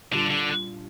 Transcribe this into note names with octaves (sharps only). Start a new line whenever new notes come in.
A#2 D3 G3 D4 F4
D3